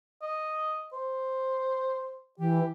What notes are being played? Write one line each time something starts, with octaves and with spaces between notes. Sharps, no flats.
D#5
C5
E3 G4